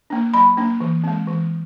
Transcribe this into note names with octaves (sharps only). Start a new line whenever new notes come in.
A#3 D4
F#3 B5
A#3 D4
E3
G#3 C4
E3